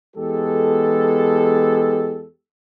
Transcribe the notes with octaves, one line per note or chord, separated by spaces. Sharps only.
E2 G#3 B3 G4 A4